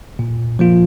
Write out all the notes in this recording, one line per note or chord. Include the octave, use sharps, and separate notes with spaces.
A#2
F3 A#3 F4